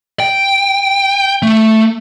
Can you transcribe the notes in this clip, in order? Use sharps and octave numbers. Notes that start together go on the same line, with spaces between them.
G5
A3